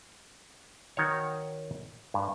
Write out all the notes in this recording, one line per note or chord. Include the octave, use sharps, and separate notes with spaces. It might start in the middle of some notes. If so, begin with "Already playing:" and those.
D#3 F#4 C#5
G2